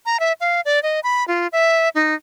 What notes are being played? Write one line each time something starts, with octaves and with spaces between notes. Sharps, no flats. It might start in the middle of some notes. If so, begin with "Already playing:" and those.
A#5
E5
F5
D5
D#5
B5
F4
E5
D#4